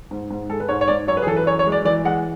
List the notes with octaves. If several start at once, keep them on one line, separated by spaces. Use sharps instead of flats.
G#2
G#2
G#3 A4
B4
G#2 C#5
C#5
G#2 D5
F#2 C#5
B4
G#4
E3 A4
B4
F#2 C#5
C#5
G#3
D5
E3 D5
G#3 F#5